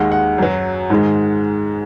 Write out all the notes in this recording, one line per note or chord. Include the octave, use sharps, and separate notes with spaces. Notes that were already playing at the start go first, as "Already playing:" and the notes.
Already playing: D#2 D#3 G#3 F#5
F#5
F#2 F#3
G#2 D#3 G#3